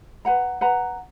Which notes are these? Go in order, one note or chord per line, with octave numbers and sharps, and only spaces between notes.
B4 F#5 A#5
B4 F#5 A#5